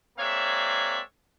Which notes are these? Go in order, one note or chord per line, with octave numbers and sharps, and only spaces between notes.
G#3 A#3 C4 C#5 D5 E5